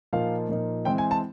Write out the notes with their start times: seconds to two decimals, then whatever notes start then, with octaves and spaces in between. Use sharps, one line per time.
0.13 A#2 F3 A#3 D#4 F5
0.49 A#2 F3 A#3 D#4
0.85 E3 G#3 C4 E4 G5
0.98 G#5
1.11 A5